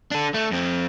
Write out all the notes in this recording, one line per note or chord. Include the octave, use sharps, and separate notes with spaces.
D4 A4
A3
F2 C4